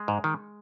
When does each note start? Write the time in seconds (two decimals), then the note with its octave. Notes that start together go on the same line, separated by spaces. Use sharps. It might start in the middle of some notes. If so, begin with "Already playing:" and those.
Already playing: G#3
0.08 G#2
0.24 D#3